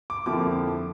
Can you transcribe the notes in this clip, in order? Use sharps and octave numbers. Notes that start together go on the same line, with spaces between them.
D6
F2 D3 F3 A#3 E4 D6